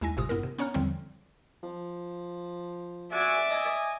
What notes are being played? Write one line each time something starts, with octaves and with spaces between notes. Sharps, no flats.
D#2 G#3 E4 G#5 A#6
G1 A2 C3 F4 D#6
G2 B3 E4 A#4
C3
B3 C#4 C#5 A#5 F6
E2 D3 F3 G3 C4
F3
F#4 D5 E5 G#5
D#5 G#5